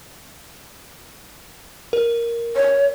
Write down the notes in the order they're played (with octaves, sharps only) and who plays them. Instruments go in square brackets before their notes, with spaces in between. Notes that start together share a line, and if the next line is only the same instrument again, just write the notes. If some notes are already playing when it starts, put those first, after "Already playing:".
[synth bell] A#4
[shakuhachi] C#5